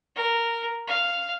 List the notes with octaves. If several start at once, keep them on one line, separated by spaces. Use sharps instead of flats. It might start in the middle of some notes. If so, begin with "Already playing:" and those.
A#4
F5